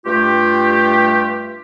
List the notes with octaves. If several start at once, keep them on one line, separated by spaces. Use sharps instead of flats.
G2 A3 F4 G4